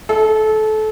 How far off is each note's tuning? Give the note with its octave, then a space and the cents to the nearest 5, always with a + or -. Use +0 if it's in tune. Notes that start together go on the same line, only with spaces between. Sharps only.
A4 -25